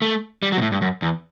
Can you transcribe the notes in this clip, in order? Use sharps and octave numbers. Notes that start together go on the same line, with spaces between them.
A3
G3
F#3
B2
A2
G2
F#2
E2